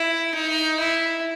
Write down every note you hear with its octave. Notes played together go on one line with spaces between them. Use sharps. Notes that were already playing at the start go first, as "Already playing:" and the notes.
Already playing: E4
D#4
E4